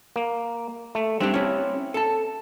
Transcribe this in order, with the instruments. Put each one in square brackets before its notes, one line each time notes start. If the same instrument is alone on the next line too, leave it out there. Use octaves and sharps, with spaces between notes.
[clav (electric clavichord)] A#3
A3
[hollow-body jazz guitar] G3 D4 G4 [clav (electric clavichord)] C4
[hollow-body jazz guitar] C#4 E4
A4 A5